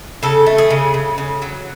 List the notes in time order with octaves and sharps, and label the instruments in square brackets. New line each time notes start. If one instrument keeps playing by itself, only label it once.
[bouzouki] C#3 A4
A3
G#4
C#3
C#3
C#3
F#3